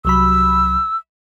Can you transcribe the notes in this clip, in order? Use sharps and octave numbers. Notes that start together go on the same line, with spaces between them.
C2 F#3 B5 E6